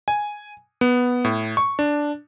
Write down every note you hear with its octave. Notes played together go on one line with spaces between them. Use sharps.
G#5
B3
A2
C#6
D4